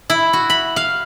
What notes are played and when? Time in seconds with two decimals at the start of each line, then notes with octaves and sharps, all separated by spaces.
0.10 E4
0.33 F#4
0.50 B5
0.76 F5